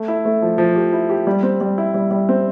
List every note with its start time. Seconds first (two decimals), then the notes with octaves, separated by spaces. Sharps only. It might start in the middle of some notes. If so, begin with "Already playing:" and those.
Already playing: A3
0.08 E4
0.25 A3
0.42 F3
0.58 F3
0.76 G4
0.93 E4
1.10 G4
1.27 G3
1.43 C4
1.61 G3
1.78 E4
1.94 G3
2.11 G3
2.29 C4